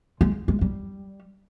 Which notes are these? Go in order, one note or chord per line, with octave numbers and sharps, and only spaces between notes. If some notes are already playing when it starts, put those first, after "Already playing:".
G#3
G#3
G3